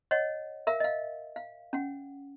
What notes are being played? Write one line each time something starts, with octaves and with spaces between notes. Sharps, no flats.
C#5 D#5 F#5
A#4 E5 F5
D#5 F5
F5
C#4 F#5